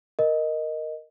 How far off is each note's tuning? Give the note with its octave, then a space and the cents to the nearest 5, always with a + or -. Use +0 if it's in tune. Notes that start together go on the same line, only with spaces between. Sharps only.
A#4 +0 D#5 +0